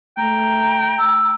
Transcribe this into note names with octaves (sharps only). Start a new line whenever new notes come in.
A3 G5 A#5
E6